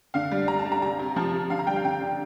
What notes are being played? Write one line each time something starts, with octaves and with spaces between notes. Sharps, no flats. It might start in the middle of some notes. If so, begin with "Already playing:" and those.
D3 F5
G3
G3 A#5
A5
G3
A#5
C3 A#5
C3
F3 A5
C3
D3 F5
A#5
G3 G5
F5
D3 G5
D3